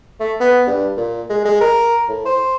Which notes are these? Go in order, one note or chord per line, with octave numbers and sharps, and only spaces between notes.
A3
B3
G2
A#2
G#3
G#3
A#4
A2
C5